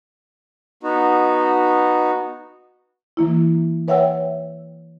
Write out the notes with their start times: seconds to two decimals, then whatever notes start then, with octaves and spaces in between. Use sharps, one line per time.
0.83 B3 D#4 F#4
3.17 E3 A#3 E4
3.88 B4 C#5 E5 F#5 G5 E6